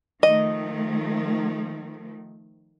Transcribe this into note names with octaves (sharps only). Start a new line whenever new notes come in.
D#3 F3 A3 D#5